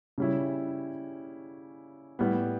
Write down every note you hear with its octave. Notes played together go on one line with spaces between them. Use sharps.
C#3 G3 C#4 E4
A2 G3 B3